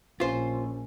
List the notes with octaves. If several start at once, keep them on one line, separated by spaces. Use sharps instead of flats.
A#1 C#4 F4 C5